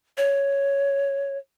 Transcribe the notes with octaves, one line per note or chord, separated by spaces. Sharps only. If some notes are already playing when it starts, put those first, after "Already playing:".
C#5